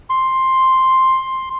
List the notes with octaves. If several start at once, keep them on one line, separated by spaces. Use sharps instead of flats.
C6